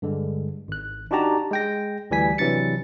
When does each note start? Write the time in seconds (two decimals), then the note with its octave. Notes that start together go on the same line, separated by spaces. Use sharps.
0.02 G2 D3 G#3
0.68 G#1 F#6
1.11 D4 D#4 F#4 G4 A5 A#5
1.51 G#3 G5 A#6
2.11 D2 E3 G3 G#5 B6
2.38 C3 E3 F#3 D4 A6 C#7